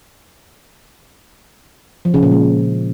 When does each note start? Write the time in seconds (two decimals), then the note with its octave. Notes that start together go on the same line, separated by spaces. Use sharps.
2.05 F3
2.14 C#3
2.23 A#2
2.32 G#3